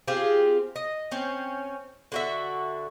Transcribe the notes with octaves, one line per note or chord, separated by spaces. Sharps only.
C4 F4 G4 G#4
D#5
C4 C#4
D3 F#4 E5